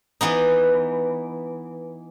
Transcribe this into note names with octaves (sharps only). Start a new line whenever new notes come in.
E3 B3 D#4